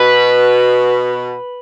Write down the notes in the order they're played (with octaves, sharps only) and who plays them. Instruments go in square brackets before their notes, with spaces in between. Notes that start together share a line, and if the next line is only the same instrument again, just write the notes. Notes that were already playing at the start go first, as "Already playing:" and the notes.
Already playing: [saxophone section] B2 [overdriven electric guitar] B4